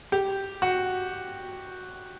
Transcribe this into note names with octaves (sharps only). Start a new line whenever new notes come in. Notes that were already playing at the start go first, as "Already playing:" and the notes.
G4
F#4